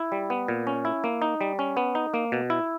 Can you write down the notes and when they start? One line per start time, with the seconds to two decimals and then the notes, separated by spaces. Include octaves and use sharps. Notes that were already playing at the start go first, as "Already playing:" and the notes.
Already playing: E4
0.12 G3
0.30 B3
0.48 A#2
0.67 C#4
0.85 E4
1.04 A#3
1.22 D#4
1.41 G3
1.59 C#4
1.77 B3
1.95 D#4
2.14 A#3
2.32 B2
2.50 E4